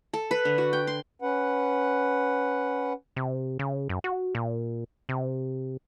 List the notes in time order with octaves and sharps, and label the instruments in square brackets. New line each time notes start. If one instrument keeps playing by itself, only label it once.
[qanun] A4
B4
D3
F#4
G5
C6
[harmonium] C#4 B4 F#5
[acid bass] C3
C#3
F#2
F#4
A#2
C3